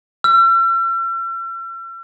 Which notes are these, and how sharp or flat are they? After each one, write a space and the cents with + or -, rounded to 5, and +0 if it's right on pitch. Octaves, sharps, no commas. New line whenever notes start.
E6 +45